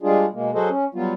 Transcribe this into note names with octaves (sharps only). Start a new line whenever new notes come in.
G3 G#3 D4 F4 G#4
B2 G#3 A#3
F#3 F#4 G#4 A4 C5 D#5
C#4
F#3 G3 B3 F4